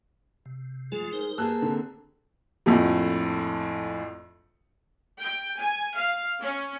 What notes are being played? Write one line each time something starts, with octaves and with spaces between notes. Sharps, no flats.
C3
F3 G#3 A3 F4 G#4
D#4 A#4 C5
A#3 G4 G#4 B4 A5 E6 F#6
D3 C4
A#1 F2 A2
G5
G#5
F5
C#4